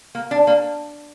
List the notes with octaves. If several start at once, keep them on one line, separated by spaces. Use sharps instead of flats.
A#3
D4
A#3